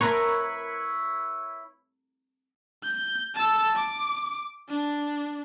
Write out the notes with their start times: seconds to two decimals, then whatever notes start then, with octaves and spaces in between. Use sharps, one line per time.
0.01 E4 A#4 B4 C#5
2.84 G6
3.35 A5 E6
3.76 D6
4.69 D4